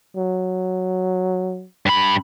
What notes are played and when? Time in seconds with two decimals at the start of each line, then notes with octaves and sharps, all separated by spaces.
0.16 F#3
1.86 G2 B5